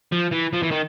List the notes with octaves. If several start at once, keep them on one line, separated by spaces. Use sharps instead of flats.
F3
E3
F3
E3
D#3